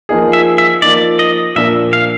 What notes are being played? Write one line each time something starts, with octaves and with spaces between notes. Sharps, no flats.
F3 A#3 D#4 G#4
E5
E5
F3 A#3 D#4 D5
D#5
A#2 F3 A#3 D4 E5
F5